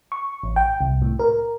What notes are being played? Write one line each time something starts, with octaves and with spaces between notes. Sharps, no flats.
C#6
A1
G5
C2
A2
A#4